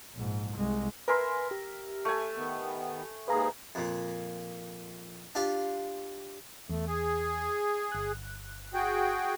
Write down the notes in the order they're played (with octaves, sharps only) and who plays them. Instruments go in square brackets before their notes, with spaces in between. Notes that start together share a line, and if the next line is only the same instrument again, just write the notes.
[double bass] A#1 G#2
C2 G#3
[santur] A#4 E5 [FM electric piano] B4 G#5 C6
[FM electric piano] G4
[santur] A3 G#5
[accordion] D#3 B3
[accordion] D#2 G#2 G#4 [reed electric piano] B4 F5 A#5
[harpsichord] F2 A#2
D4 F4 G4 F5
[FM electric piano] E2 [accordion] A3
[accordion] G#4
[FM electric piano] G1 F#6
[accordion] F#4 G#4 G5